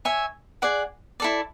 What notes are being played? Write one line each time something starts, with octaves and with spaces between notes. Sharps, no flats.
C#5 E5 G#5
G#4 D5 F#5
E4 A4 D5